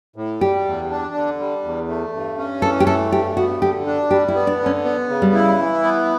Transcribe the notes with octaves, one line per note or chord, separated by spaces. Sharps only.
A2
G3 G4
E2
D4
D3
G3
E2
A3
G2
C#4
E3 A4
G4
A3 A4
G2 G4
B3 F#4
D3 G4
D4
G3 G4
E4
B3
D4
D3
C#4
B3
C#3
G3
E4
E3
B3